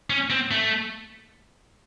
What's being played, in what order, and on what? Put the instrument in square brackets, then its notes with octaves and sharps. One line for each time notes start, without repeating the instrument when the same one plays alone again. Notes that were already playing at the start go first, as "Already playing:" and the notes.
[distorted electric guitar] C#4
C4
A3